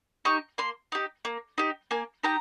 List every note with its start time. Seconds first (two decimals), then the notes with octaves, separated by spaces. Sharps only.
0.25 D#4 G4 C#6
0.58 A#3 C6
0.92 D#4 G4
1.25 A#3
1.58 D#4 G4
1.91 A#3 G#5
2.23 D#4 G4 A#5